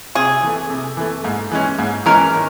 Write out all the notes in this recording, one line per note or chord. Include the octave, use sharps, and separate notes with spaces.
C3 G#4
E3 A3
C3
E3 A3
G#2
E3 G#3 C#4
G#2
E3 G#3 C#4 A#4
D#3